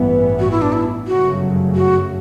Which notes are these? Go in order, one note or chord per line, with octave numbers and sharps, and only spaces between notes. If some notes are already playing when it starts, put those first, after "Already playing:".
Already playing: A1 G2 E3 B3
F#4
E4
D4
E4
G1 F#2 C#3 F#3 A3 F#4
F#4